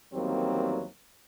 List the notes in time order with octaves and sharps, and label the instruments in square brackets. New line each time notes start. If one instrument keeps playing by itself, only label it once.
[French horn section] E2 D#3 F#3 G3 A#3 C4